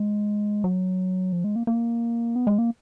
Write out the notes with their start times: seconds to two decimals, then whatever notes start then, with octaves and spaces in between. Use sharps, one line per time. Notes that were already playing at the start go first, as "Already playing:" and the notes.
Already playing: G#3
0.64 F#3
1.33 F3
1.44 G#3
1.56 A#3
1.67 A#3
2.36 B3
2.47 G#3
2.58 A#3